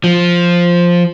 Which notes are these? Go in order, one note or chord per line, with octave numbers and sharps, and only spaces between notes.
F3